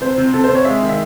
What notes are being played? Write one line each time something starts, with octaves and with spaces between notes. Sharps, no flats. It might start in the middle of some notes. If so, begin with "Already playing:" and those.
C3 C5
C3
C3 A4
C5
C3
C#5
G#3 E5
D#3
E5